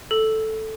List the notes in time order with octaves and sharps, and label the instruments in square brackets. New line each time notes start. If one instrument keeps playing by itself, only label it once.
[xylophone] A4